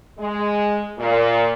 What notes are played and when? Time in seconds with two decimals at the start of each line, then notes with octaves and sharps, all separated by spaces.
0.19 G#3
0.98 A#2